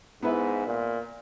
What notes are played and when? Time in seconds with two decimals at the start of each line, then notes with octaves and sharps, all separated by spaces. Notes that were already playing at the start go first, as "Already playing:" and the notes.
0.22 G#2 B3 E4 B4
0.66 A#2